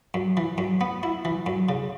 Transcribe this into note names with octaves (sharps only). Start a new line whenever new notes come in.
F#2
E3
F#2
B3
E4
E3
F#2
C#3